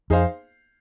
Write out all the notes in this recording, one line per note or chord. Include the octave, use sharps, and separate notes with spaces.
F2 D#4 G#4 C5 F5